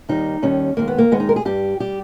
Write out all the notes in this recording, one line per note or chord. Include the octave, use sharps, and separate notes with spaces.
D#2 D#3 G3 D#4
D#2 D#3 G3 C#4
D#2 D#3 G#3 A#3
B3
A#3
D#2 D#3 G#3 B3
D#4
A#4
G#4
G2 G3 G4
G3 G4